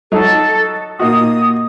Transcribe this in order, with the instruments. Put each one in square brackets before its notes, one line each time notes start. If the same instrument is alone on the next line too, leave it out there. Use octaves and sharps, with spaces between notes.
[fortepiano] F#3 D#4 [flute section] A4
[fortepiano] A#2 D#4 F#4 [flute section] D#6